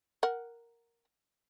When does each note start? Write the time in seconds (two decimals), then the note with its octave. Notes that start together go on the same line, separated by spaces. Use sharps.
0.23 A#4 F#5